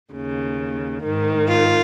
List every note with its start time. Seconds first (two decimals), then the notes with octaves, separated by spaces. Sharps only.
0.12 D#2 C#3
1.03 G#2 D#3
1.48 F4